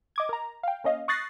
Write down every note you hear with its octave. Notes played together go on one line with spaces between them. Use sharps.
D#5 D6 G#6
A#4 A#5
F5 G5
A#3 C#4 D#5 F5
C#6 D#6 F#6 A6 A#6 C7